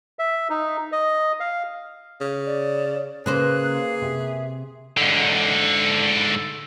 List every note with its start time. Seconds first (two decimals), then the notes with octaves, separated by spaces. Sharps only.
0.19 E5
0.50 D#4
0.92 D#5
1.40 F5
2.21 C#3
2.47 D5
3.26 C#3 A#3 G#4 B4 C5 F#6
3.75 F5
4.02 C3 E5
4.97 G#2 D3